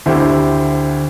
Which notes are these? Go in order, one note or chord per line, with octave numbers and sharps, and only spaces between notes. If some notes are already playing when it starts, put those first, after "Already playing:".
D2 D3 C4 E4 G4